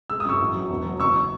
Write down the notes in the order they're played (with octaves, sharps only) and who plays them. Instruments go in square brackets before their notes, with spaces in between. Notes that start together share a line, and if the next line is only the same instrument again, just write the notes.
[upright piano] G#3 E6
D#6
F#2 C#6 E6
A1
F#3
E1
F#3
F#1 C#6 E6